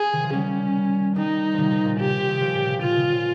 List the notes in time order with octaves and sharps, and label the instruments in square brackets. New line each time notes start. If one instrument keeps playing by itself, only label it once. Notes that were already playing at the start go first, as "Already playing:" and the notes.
Already playing: [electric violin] G#4
[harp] C3 D#3
C#3 F3
[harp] D#3 G3 [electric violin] C#4
[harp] D#3 G3 [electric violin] D#4
[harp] C3 D#3 F3
C3 D#3
A#2 C#3
[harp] C3 [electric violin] G4
[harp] C3
C3 D#3
C#3 F3
A#2 C#3
C3
[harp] A#2 C#3 [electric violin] F4
[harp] C3 D#3
A#2 C#3